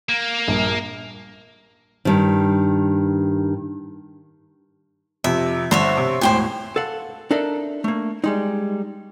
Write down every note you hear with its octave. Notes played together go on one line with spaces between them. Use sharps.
A#3
A#1 G2
G2 D#3
F2 C3 E5
G1 G2 D3 C5 C#5 E5
C3
E1 A2 C5 G5 G#5
A4 F5 F#5
D4 D#4 A4 A#4 E5
A3 A#3
G3 G#3 D#4